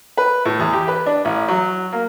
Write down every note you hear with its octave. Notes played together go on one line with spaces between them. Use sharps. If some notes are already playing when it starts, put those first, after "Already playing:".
B4
A2
E2
G4
B4
D4
A1
F#3
A#3